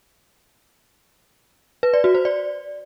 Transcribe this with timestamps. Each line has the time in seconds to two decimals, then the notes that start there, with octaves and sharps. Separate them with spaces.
1.83 B4
1.94 D5
2.04 F#4
2.15 C5
2.25 D5